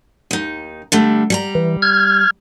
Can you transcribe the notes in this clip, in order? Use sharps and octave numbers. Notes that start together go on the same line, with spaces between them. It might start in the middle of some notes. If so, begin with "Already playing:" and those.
D#2 D#4
D3 G3 A3
G3 G#5 A#5
E3
F6 G#6